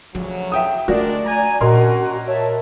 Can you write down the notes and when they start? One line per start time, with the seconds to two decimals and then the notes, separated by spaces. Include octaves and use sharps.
0.15 D2 C#3 F3 F#3
0.52 E5 G5 D#6
0.88 G#3 A3 C#4 D4 F#4 A#4 D5
1.26 G#5 A#5
1.61 C2 A#2 C#4 D4 F#4 A#4 D#5 C6
2.26 C#5 E5 A5